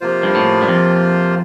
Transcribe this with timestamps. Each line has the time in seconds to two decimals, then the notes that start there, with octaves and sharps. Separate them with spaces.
0.01 C3 F3 A#3 F4 C5
0.23 G2
0.35 A2
0.62 G2
0.68 F2